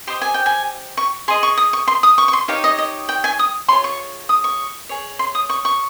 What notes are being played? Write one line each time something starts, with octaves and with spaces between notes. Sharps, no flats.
G4 C5 D#5 C6
G#5
G5
G#5
C#6
G#4 D#5 C6
C#6
D#6
C#6
C6
D#6
C#6
C#6
C6
D#4 G4 C#5 F5
D#5
D#5
G5
G#5
D#6
F4 G#4 C#5 C6
C#6
D#6
C#6
G#4 C#5
C6
D#6
C#6
C#6